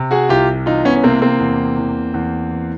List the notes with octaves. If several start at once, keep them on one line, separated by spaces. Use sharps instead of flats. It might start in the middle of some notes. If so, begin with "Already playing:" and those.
Already playing: C3
F#4 G#4
C2 F4 G4
E3 D#4 F4
B3 C#4
C#4
C3 A#3 C4
A#3 C4
E2
E2
E2
E3